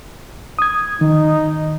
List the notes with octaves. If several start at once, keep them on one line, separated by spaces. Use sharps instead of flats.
D#6 G#6
D#3 D#4